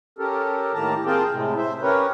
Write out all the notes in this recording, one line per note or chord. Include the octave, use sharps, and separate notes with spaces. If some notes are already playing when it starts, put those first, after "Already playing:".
C#4 G4 A4 A#4
A2 D#3 A#3 G4 A5 A#5
C4 F4 G#4 A#4 G5 A5
A2 C3 G#3
C5 E5
C#4 G4 A#4 B4 C#5